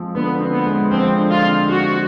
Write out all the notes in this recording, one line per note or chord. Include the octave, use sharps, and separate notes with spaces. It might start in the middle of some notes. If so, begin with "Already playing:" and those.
Already playing: F3 G#3 C4
D3 B3
C4
B3
G#3
F3 C4
D3
F4
C4
G#3 F#4